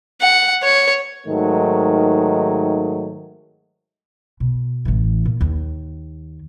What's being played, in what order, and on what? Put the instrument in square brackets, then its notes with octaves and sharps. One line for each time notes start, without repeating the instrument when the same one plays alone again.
[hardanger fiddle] F#5
C#5
[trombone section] G#2 D#3 F#3 A3
[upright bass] B2
A1 E3
A#2
D#2